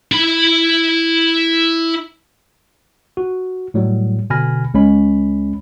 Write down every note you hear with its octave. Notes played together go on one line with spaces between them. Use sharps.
E4 B5
F#4
A2 F#3 G3
B2 D3 G#5 B5 F6 A#6
C#2 G#3 C#4 B5